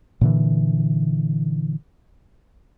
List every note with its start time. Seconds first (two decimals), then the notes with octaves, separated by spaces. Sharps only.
0.21 A#2 D3 E3